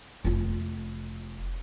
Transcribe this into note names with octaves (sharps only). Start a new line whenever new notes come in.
F1 F4